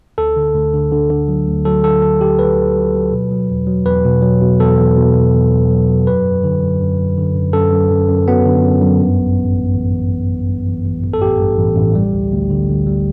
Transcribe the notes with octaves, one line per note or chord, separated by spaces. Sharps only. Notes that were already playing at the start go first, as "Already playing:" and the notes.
D2 A4
D3
D2
D3
D3
D3
F#3
D2
F#3 A4
D3 A4
D3 A4
D3 G4
D2 B4
D3
F#3
F#3
B2
F#3
E2
F#3
E2 B4
B2
F#3
B2
E2 A4
E2
B2
B2
E2
E2
F#3
F#3
F#2 B4
F#2
D3
F#2
F#2
F#2
D3
F#2
F#2 A4
F#2
F#2
F#2
F#3 B3
D3
F#2
F#2
G2
A1
A1
G2
A1
E3
A1
G2
G2
E3
A1
A1
A4
A1 G4
G2
A1
A1
G3
D2
D2
D3
D2
G3